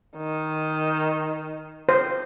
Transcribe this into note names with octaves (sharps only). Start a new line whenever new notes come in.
D#3
C5